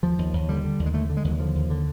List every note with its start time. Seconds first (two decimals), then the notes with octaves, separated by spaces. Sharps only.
0.03 D#2 F3
0.19 D#2
0.33 D#2
0.49 D3 G3
0.64 D3
0.79 D#2
0.86 G#3
0.94 D3 A3
1.10 D3
1.17 G#3
1.24 D#2 F#3
1.39 D3 F3
1.55 D#2
1.70 D3